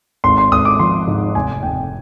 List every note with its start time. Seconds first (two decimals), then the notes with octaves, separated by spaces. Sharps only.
0.24 G#1 C6
0.38 C6
0.52 G#1 D#6
0.65 D6
0.79 F3 C6
1.08 G#2
1.35 F1 G#5
1.63 F1 G5